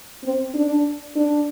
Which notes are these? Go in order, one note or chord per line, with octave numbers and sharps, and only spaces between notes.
C4
D4
D4